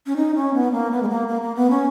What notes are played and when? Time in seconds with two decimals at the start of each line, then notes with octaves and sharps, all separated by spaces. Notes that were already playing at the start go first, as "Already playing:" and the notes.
0.06 C#4
0.17 D#4
0.35 C#4
0.54 B3
0.72 A#3
0.91 B3
1.03 G#3
1.09 A#3
1.28 A#3
1.42 A#3
1.56 B3
1.70 C#4